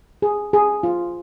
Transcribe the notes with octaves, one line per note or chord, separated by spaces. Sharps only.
G#4
G#4
F4